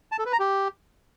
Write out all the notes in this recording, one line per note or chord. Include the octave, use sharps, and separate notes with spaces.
A5
A4
B4
A#5
G4